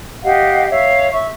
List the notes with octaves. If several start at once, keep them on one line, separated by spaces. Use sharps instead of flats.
G4 D#5 F5 F#5
C#5 E5 F5
E5 C#6